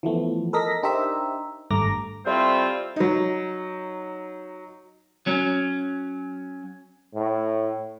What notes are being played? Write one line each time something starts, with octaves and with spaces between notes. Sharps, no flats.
E3 F3 A3 B3
A4 A#4 D#5 A#6 B6
D4 D#4 G4 A#4 C5 E5
G#1 G2 A3 A#5 D6 A#6
G3 A3 C4 E4 F4 C5
F#3 D#4
F#3 C#4
A2